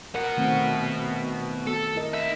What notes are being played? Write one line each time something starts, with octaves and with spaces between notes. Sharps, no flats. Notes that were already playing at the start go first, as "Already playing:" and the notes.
B2 A#4 F#5
D#3 A3 C4
A4
E4 A#4 D#5
D#4 E5